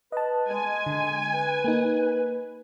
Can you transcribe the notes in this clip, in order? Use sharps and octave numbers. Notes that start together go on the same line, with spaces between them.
B4 D#5 A5
G#3 G#5
D3
B4
A#3 D#4